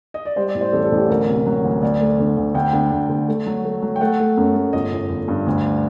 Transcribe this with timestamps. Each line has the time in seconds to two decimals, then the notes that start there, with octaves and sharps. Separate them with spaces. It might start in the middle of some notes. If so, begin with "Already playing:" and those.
0.14 D#5
0.25 D5
0.36 G3 C5
0.48 D5
0.55 A2
0.61 C5
0.73 A1 A4
0.85 A4
0.92 A1
0.98 G4
1.09 D2 A#4
1.28 C3
1.46 F#3
1.64 D2
1.82 D2 D5
2.01 A3
2.19 D3
2.37 D2
2.55 D2 G5
2.73 D3
2.92 D2
3.10 D3
3.29 A3
3.46 F#3
3.64 A3
3.82 F#3
3.96 G5
4.01 A3 F#5
4.19 A3
4.37 F#2
4.55 A3
4.73 G1 D#5
4.92 G1
5.10 G1
5.28 G2
5.47 D2